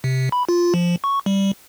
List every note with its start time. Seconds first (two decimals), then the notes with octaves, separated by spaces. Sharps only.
0.04 C3
0.32 B5
0.49 F4
0.74 F3
1.04 C#6
1.26 G3